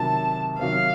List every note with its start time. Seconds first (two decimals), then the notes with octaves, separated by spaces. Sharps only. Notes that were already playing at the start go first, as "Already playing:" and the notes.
Already playing: C3 D#3 F#3 A5
0.59 C3 D#3 F#3 F5